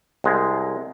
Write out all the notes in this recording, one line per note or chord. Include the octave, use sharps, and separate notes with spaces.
C2 G#3